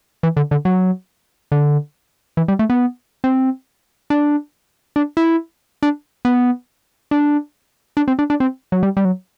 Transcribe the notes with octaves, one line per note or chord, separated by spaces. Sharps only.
E3
D3
D3
F#3
D3
E3
G3
A3
B3
C4
D4
D4
E4
D4
B3
D4
D4
C4
D4
D4
C4
F#3
G3
G3
F#3